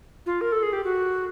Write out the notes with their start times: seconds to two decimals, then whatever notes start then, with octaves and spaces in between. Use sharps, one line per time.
0.26 F4
0.41 A#4
0.52 A4
0.63 G#4
0.73 G4
0.84 F#4